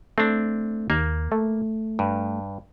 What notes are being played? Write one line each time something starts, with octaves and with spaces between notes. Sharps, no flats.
A3 C4 D4
D#2 A#3
A3
G2